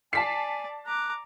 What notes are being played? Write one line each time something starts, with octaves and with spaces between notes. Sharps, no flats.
D5 G#5 A5 B6 C7
A#5 D6 F#6